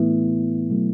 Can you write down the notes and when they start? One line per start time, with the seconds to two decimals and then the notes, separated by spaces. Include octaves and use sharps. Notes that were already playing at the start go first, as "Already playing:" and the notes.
Already playing: A2 E3 A3 B3 E4
0.70 B2 F#3 A3